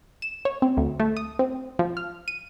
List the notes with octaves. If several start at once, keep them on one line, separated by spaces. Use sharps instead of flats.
E7
C#5
C4
D2
A3
D#6
C4
F3
F6
D#7